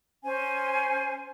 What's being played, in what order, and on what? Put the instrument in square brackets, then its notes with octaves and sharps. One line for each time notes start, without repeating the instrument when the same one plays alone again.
[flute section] C#4 C5 G#5